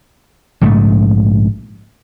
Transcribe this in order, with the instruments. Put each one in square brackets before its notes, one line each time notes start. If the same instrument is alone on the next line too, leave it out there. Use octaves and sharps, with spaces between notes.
[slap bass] A#1 G#2 C#3 A3